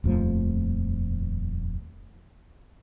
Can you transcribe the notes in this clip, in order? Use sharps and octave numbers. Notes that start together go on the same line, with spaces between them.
D#1 F2 F3 A3